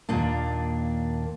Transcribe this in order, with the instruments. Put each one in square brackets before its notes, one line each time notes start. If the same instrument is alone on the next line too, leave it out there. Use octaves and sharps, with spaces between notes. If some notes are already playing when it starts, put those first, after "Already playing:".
[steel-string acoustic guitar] D#2 A#2 A#3 D4